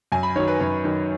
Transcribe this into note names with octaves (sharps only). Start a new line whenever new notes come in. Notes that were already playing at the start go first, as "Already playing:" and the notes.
F#2 G#5
B5
D#3 F#3 C#5
B4
F#2 C#5
D#3 F#3